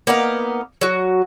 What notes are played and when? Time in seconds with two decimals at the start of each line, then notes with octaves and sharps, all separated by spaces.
0.07 A#3 B3 D#4 F5
0.81 F#3 F#4